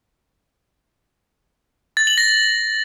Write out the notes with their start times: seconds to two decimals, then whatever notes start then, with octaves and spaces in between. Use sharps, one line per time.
1.97 A6
2.07 F#7
2.18 A#6